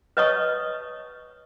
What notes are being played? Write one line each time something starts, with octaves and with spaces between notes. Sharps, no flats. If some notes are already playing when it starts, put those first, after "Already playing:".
B4 C#5 D#5 A5 C#6 D#6